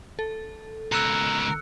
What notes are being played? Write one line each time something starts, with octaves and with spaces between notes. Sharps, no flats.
A4
C#2 B2 A#4 E6 F#6 C#7